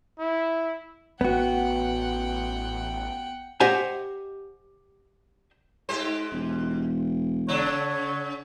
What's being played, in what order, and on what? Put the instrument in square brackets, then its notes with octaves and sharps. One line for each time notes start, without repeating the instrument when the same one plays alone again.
[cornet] E4
[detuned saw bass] A1 [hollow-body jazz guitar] B3 F#4 [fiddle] F#5 G5
[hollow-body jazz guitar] G4 C5 D#5 F#5 G#5
[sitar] G#2 G4 C5
[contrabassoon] E1
[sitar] C#3 D4 [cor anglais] C#5